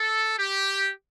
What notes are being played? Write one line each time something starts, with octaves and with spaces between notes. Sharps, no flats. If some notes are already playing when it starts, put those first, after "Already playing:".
Already playing: A4
G4